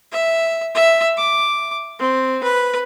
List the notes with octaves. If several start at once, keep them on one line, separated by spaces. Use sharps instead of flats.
E5
E5
D6
C4
B4